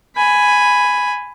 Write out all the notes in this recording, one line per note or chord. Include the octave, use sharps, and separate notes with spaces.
G#5 B5